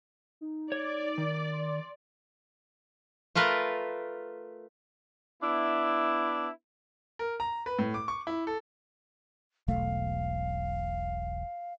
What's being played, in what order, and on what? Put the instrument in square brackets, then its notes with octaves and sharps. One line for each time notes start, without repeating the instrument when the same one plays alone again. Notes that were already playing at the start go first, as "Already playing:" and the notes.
[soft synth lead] D#4
[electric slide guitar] C#5 [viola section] D5
[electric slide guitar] D#3
[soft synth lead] C6
[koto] A3 F4 A#4 B4
[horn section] B3 D4 E4
[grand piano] A#4
A#5
B4
A2
D6
C#6
E4
A4
[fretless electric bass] E1 B1 A3 [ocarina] F5